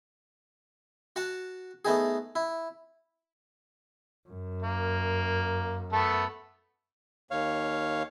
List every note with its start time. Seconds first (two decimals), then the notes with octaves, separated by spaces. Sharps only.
1.16 F#4 F#5 A5
1.85 A3 B3 D#4 G#4
2.36 E4
4.29 F#2
4.62 A#3
5.93 A3 B3 A4
7.31 D#2 C#5 F5